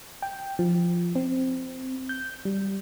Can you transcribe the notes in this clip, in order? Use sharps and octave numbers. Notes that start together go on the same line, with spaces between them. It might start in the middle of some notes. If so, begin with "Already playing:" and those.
G5
F3
C4
G6
G3